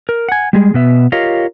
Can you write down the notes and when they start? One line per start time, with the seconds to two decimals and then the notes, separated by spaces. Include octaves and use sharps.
0.09 A#4
0.29 F#5 G#5
0.53 G3 G#3 G#4
0.74 B2 B3 E5
1.12 F4 G4 A#4 C#5 D#5 F5